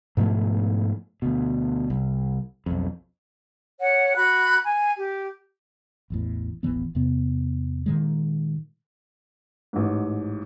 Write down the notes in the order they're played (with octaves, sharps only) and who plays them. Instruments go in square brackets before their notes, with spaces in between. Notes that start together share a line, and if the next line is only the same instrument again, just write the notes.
[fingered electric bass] G#2 B2 F3 A3
D2 B2
C2
B1 F2
[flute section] C#5 F#5
F#4 B5 F#6
G#5
G4
[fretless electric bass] A1 E2 A2
D#1 A1 E3 B3
E2 C3 B3
A#2 D#3 G#3
[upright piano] A1 G#2